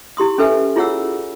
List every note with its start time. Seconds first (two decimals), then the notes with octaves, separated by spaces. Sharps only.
0.17 E4 G4 C6 D#6
0.38 C#4 A4 B4 E5 G#5
0.76 E4 F4 G#4 C#5 F#5 E6